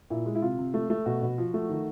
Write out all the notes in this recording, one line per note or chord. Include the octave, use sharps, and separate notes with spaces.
A#2 E4
G#3
E4
C3 F4
C3
A3
A3
B2 F#4
B2
F3
A3
D#3